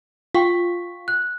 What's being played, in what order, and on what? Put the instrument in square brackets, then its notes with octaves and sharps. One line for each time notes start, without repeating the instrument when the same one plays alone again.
[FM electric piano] F4 [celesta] G5 C#6 B6
[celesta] F#6